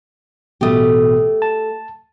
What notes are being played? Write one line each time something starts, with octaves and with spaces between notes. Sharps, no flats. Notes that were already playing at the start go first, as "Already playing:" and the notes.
A1 B2 A3 G4 D#6
A5